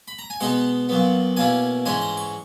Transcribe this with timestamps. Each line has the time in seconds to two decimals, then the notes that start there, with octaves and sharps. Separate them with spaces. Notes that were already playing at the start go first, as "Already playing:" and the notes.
0.08 B5
0.19 A#5
0.30 G#5
0.40 B2 G#3 B3 D#4 F#5
0.89 A#2 F#3 B3
1.37 B2 A#3 C#4 E4 G#5
1.86 G#2 E3 G#3 C#4 E4 G#5
2.02 A#5
2.17 C#6